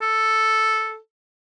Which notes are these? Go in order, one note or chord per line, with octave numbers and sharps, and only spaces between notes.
A4